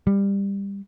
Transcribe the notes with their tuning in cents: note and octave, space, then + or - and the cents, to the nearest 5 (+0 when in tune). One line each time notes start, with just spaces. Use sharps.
G3 +20